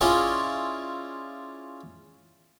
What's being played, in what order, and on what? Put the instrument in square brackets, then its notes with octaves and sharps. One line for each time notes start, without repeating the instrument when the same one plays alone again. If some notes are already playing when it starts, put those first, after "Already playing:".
[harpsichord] C#4 E4 F4 G#4 D5 D#5